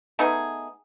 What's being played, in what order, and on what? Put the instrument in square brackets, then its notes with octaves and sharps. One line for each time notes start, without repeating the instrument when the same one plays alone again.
[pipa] A3 B3 D#4 G#4